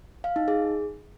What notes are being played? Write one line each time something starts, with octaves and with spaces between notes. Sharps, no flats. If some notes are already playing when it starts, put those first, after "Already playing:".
F5
D#4
G#4